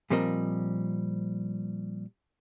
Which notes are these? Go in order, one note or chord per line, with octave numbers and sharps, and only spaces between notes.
A#2 F3 G3 C4 A#4 D#5